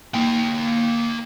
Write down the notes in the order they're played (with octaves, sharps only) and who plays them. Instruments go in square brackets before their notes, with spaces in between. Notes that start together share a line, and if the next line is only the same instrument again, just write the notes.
[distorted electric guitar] A#3 G5